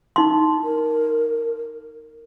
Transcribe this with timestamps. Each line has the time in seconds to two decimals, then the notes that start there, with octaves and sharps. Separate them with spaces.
0.16 D#4 C6
0.63 A#4